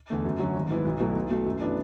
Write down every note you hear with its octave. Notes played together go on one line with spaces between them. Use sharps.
E2 D3 A3
F#2
D3 F#3 C#4
G#1
G#2 E3 B3 E4
B1
B2 F#3 A3 E4
B1
B2 A3
F#2
E3 B3 D4